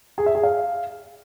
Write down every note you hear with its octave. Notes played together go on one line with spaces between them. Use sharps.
G#4
E5
G#4
F5